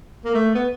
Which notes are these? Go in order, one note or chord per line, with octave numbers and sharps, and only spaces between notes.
A#3
A3
B3